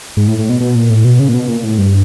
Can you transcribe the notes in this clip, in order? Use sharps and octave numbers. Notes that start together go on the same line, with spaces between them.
G#2
A2
A2
B2
B2
A#2
A2
B2
C#3
A#2
B2
A#2
A2
G2